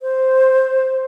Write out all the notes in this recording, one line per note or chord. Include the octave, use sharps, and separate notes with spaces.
C5